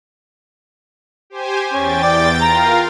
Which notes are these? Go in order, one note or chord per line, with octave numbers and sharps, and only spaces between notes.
G4 C5 G#5
E2 C#4 G5 A6
D5
F4 A#4 F5 A#5